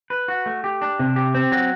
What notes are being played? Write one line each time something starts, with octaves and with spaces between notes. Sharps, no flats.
B4
F#4
A3
G4
D4
C3
G4
C4
F#3